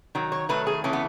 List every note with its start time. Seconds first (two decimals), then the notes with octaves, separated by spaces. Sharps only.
0.15 D#3 F#3
0.32 C#5
0.49 D#3 F#3 A3 B4
0.67 G#4
0.84 C#3 E3 A3 C#4
0.93 B3